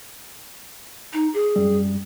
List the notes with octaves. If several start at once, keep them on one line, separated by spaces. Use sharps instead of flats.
D#4
G#4
F#2 G3